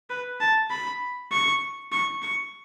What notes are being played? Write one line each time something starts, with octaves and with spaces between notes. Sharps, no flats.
B4
A5
B5
C#6
C#6
C#6